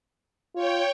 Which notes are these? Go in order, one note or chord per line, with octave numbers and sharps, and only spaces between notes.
F4 C#5 G5